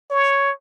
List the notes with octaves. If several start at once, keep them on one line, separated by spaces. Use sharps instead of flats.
C#5